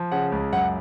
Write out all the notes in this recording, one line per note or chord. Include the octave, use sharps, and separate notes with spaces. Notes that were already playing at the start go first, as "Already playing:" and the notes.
Already playing: F3
C#3 F#5
C#2
F#2 F#5